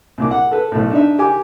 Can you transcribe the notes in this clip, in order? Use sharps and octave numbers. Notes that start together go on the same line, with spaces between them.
C2 A#2 D6
F#5
A4 B4
B1 A2
D4 D#4 E5
G4 G#5 D6